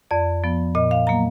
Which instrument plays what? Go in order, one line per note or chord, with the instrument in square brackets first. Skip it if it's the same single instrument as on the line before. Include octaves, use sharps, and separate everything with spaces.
[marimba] F2 D5
F3 B3
A#2 D#5
F5
F#3 A#3 A#5